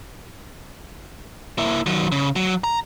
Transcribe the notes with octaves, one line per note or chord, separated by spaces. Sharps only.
A#3 E4
D#3 F#3
C#3
F#3
A#5